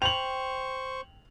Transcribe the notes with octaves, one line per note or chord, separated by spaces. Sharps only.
C5 G5 B5 C#6 F7 F#7